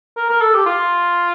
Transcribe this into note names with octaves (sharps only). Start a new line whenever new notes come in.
A#4
A#4
A4
G4
F4